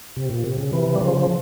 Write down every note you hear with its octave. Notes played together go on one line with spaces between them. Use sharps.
C3
A#2
C3
C#3
C3 E3
G3
C#3 F3